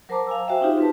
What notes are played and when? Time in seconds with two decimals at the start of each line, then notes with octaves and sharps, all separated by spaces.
0.09 F#3 A#4 C5 A5 A#5 D6
0.27 F5 G#5 E6
0.46 F#4 C5 E5 F5 G5
0.61 C4 D4 D#4 F4 G4
0.78 C4 G4 B4 A5